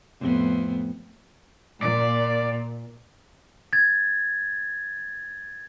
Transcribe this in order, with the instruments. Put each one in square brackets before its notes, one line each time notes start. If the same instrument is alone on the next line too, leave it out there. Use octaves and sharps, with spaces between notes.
[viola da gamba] F2 A2 B3
[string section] A#2 [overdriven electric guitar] D5
[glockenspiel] G#6 A6